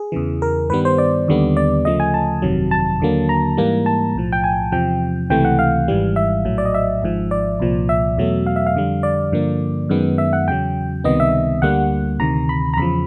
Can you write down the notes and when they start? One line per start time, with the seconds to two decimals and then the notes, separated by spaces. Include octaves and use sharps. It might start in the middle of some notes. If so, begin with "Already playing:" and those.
Already playing: G#4
0.12 E2 C#3 E3
0.42 A#4
0.70 G2 D#3 G3 B3 B4
0.85 C5
0.98 D5
1.28 D#2 D3 G3 B3
1.57 D5
1.85 D2 C#3 F3 A3 D#5
2.00 G#5
2.14 A5
2.42 G1 F2 C3 D#3 F#3
2.71 A5
3.00 D#2 D3 F#3 A#3
3.29 A#5
3.57 G#2 E3 G3 A#3
3.86 A5
4.15 B1 A2 F3
4.32 G5
4.44 G#5
4.72 E2 C3 F3 G5
5.30 C#2 C3 E3 A3 G5
5.45 F#5
5.59 F5
5.88 G#1 G#2 E3 G3
6.16 E5
6.45 A#1 A2 F#3
6.58 D5
6.65 D#5
6.74 E5
7.02 G#1 G#2 F3
7.31 D5
7.60 C2 A#2 F3
7.89 E5
8.17 E2 B2 F#3 A3
8.47 F5
8.56 E5
8.66 F5
8.75 F2 D3 G3
9.03 D5
9.32 G2 D3 F3 A#3
9.89 F#2 D#3 G#3 B3
10.18 E5
10.33 F#5
10.48 E2 C#3 F#3 G5
11.04 C#2 C3 D#3 G3 B3 D#5
11.20 E5
11.62 D2 D3 G3 A#3 F#5
12.19 D2 C3 D#3 A#5
12.49 B5
12.74 A#5
12.77 E2 C#3 F3 B5